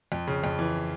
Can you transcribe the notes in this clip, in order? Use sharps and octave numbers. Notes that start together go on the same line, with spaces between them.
F2
C#3
F2
E3